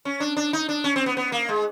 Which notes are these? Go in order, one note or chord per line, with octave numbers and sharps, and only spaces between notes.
C#4
D4
D4
D#4
D4
C#4
C4
B3
B3
A#3
G#3